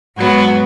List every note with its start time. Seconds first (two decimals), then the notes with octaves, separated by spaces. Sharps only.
0.17 G#2 F#3 B3 F#4